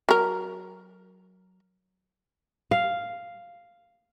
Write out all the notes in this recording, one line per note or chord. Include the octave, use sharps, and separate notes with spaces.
F#3 A#4
F5